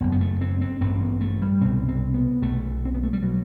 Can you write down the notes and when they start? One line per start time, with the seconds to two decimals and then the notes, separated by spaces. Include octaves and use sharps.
0.01 F#1 F#2 B3
0.12 B3
0.21 A3
0.41 C4
0.61 C4
0.81 A1 G2 C4
1.01 B3
1.21 A3
1.42 G3
1.61 C2 B2 C4
1.88 C4
2.14 B3
2.42 B1 B2 A3
2.85 C4
2.95 B3
3.03 A3
3.13 G3
3.23 B2 F#3